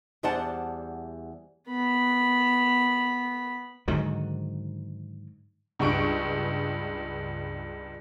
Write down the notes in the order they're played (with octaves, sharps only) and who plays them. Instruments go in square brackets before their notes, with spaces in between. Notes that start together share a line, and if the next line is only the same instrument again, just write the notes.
[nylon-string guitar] E2 G3 C5 D5 F#5 A5
[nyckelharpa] B3 B5
[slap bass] G#2 D3 D#3 F#3
[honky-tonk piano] C#2 G2 C#6 D7